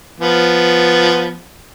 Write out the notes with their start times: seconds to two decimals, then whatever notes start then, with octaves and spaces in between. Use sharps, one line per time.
0.20 F3 B3